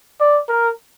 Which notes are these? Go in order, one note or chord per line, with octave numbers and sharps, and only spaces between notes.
D5
A#4